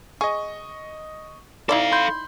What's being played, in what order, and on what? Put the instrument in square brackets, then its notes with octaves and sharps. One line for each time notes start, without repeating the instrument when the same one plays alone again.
[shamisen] G#4 [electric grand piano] D#5 C#6
[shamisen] D#4 E4 D5 [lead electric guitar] A4 F5
[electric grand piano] B5 C6 G6